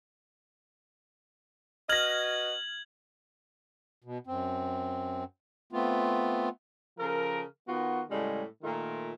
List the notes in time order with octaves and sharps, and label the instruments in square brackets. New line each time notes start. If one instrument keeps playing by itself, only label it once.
[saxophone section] F#4 B4 D#5 [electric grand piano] F6 A#6 [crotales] G#6 F#7
[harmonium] B2
F#2 C4
A3 B3 C4 F4
[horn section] C#3 F3 A4 A#4
D#3 B3 F4 F#4
A2 C#3 G3 G#3 C#4
A#2 D#3 A3 F4 A#4